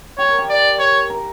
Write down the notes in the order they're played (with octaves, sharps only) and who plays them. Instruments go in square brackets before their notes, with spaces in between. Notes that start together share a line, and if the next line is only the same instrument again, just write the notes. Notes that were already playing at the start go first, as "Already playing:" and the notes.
[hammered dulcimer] G4 [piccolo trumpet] C#5
[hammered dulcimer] A#4
G4
[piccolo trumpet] D5
C#5
[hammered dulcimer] A#4